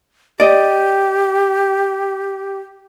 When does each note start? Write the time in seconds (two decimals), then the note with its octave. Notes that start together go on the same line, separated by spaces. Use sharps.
0.40 G4 D5 D#5